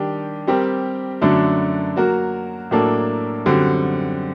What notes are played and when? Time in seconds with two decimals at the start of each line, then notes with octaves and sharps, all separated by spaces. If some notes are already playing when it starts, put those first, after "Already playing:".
Already playing: D#3 G3 D4 G4
0.47 G3 C4 G4 A#4
1.22 F#2 D3 F#3 A3 D4
1.96 F#3 A#3 F#4 A#4
2.71 A2 F#3 A#3 D4 A4
3.46 F#2 D3 G3 C4 F#4